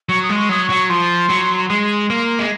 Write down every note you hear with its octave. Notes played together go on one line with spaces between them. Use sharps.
F#3 C#6
D#6
G#3
C#6
F#3 D#6
F#3 C#6
F3 C6
F#3
G#3 C6
A#3
G#3